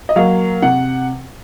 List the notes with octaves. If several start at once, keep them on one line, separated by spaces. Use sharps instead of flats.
D#5
F#3 A#3 F5
C3 F#5